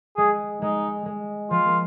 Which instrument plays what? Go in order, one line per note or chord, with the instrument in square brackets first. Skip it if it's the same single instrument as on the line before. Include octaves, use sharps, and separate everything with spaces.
[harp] G#3 [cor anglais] G#4
[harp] G#3 [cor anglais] D#4
[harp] G#3
[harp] F3 [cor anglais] F4
[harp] A#3